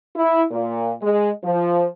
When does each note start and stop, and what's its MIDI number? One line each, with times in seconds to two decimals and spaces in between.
0.17 0.44 64
0.52 0.92 46
1.02 1.30 56
1.44 1.86 53